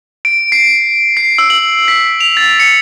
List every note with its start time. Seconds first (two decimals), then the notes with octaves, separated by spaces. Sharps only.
0.25 D7
0.52 C7
1.17 C7
1.38 E6
1.50 F#7
1.88 B6
2.20 F7
2.37 A6
2.60 C#7